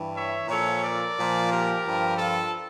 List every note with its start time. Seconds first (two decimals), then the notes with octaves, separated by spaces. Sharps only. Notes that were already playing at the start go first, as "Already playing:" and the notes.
Already playing: G2 E3
0.15 C#5 E5
0.48 A#2 F3 A4 C#5
0.82 A#4 D5
1.17 A#2 F3
1.50 G4 A#4
1.85 G2 F3
2.18 F4 A4